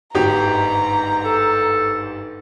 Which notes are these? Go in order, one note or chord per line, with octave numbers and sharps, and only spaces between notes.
G1 G#2 G4 A#5
A4